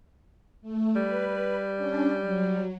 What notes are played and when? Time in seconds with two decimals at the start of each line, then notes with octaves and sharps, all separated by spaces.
0.61 A3
0.96 G3 B4
1.76 C#4 D4
2.21 F#3